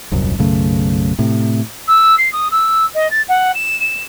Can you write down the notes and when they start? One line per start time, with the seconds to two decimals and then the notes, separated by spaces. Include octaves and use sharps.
0.12 D#1 C2 F#2
0.39 B1 F#2 C#3 A3
1.19 A2 C3
1.87 E6
2.18 C7
2.32 D#6
2.51 E6
2.94 D#5
3.10 A6
3.28 F#5
3.54 E7
3.80 E7